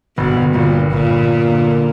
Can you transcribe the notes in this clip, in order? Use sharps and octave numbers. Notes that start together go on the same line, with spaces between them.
G1 B2
G1
G1 A#2
G2
G1 A#2
G1
A#3
D3
A#3